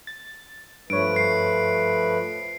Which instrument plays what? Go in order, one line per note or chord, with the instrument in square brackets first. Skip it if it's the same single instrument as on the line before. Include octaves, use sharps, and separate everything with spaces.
[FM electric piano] A6
[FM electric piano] G2 C#5 [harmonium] F3 A3 B4 [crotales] D7
[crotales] C7